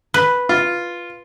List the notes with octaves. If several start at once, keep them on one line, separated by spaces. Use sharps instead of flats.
B4
F4